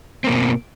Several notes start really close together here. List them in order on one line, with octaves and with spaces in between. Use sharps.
C4 A#3 B2